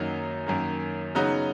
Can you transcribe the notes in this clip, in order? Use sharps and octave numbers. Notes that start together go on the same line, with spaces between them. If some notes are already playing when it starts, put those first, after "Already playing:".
Already playing: F#2 D#3 F#3 A#3 D#4
F#2 D#3 A#3
C#3 F#3 B3 D#4 F#4